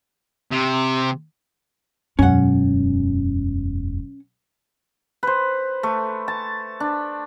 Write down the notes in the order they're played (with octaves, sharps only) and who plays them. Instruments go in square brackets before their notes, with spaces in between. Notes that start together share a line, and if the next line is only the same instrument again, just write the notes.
[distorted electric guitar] C3
[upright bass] E1 F#2 [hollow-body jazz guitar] C#4 F#5
[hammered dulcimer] B4 C5
A3
A5
D4